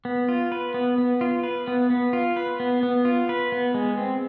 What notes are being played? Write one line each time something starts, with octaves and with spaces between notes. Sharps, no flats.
B3
F4
B4
B3
B3
F4
B4
B3
B3
F4
B4
B3
B3
F4
B4
B3
G#3
C4